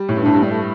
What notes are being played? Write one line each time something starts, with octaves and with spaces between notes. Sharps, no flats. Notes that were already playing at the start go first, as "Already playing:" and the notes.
Already playing: G3
A2
G2
A2 D4
G2
G3
A3